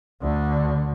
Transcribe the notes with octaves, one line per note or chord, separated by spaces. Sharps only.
D2 D3